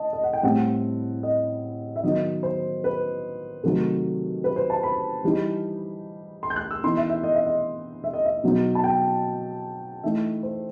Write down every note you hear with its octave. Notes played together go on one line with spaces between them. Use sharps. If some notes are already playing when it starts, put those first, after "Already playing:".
Already playing: D#5 A5
D#5
F#5
G5
A2 G3 C4 F#5
D#5
E5
D#3 F#3 B3 D#4 D#5
C5
B4
C3 D#3 F#3 A3 D#4 A4
B4
C5
A5
B5
E3 G3 D#4
C6
G6
F#6
E6
E3 B3 D#4 C6
E5
E5
D#5
E5
D#5
E5
D#5
E5
B2 F#3 B3 D#4
A5
G5
E3 A3 D#4 E5
C5